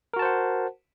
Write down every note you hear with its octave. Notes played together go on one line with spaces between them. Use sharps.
F#4 A#4 C5 F#5 A5